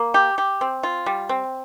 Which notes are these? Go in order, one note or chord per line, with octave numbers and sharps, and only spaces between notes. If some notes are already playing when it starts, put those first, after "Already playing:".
Already playing: A#3
G4
G4
C4
F4
G3
C4